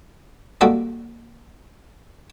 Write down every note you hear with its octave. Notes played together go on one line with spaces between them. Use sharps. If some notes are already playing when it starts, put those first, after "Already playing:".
G3 A#3 F4 F#4 A4 D#5